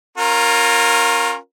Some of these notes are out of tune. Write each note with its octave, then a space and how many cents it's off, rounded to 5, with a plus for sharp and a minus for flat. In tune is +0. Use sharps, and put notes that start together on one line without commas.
C#4 -20 F4 +25 A#4 +0